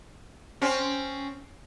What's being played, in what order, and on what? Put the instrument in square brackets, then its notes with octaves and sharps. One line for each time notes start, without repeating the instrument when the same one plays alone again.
[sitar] C4 C#4